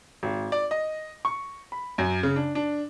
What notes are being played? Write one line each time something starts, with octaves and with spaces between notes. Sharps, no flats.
G#1
D5
D#5
C#6
B5
F#2
C#3
D4
D4